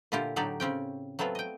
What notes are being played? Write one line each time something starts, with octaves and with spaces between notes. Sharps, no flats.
A#2 D3 E4 F4 G4
A2 D3 F#3 D#4 G4 D5
C#3 C4 C#4 G5
F#3 A3 B3 C4 F4
D#5 G5